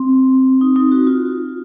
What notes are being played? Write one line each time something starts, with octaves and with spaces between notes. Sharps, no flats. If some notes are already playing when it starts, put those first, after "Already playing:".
Already playing: C4
D#4
D#4
F#4
F4